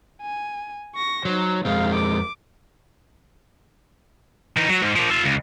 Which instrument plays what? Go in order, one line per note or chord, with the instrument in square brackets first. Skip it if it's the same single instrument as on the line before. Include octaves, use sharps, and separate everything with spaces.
[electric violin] G#5
C#6 A#6
[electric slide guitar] F#3 [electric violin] D#4 C5
[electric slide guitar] F2 G#3 C4 [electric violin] F5
[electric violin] D6
[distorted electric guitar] E3 D#4
F#3
G#2
F3 A#3
F4 E5
C#2